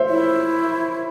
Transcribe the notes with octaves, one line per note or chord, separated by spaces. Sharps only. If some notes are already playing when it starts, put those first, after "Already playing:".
Already playing: C5 C#5 E5
E4